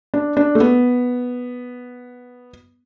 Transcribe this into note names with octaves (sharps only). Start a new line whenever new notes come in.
D4
D4
A3
B3